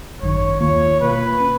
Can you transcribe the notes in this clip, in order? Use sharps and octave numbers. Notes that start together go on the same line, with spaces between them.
G#1 F#2 D#3 C#5
D#2 D#3 A#3 F4 C#5
B2 A#3 F4 B4
C#4